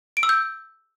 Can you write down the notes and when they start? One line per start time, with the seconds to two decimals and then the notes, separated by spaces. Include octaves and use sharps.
0.17 D7
0.23 E6
0.29 G6